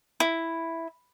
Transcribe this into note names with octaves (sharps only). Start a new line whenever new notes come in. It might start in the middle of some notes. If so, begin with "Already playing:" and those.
E4